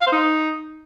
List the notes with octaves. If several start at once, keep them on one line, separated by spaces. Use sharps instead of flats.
F5
C5
D#4